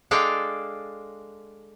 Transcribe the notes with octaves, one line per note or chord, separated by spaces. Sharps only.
G#3 D4 A4 F5 G5